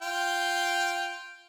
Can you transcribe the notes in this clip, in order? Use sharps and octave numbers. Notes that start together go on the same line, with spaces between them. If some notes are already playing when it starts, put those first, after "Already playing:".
F4 G5